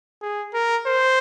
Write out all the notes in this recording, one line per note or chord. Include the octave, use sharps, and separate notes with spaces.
G#4
A#4
C5